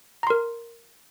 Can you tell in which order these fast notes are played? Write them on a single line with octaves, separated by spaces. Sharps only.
A#5 C6 A#4